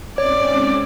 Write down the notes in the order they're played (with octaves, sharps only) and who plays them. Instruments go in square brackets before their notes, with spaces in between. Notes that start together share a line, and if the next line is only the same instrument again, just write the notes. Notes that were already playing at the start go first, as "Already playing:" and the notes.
[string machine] G#2 C4 C#4 [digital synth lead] C#5 [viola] D5